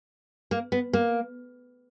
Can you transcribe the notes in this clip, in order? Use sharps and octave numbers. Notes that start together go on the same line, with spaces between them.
A#3
B3
A#3